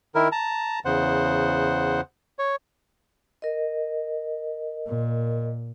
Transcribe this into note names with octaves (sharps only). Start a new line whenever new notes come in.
D#3 E4 A#4
A5 A#5
E2 C#3 C5 F#5
C#5
A#4 D#5
A#2